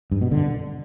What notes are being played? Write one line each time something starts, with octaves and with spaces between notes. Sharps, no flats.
G2
B2
D3